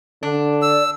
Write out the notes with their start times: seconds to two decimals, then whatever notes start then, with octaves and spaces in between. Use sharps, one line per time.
0.23 D3 D4
0.62 D5 E6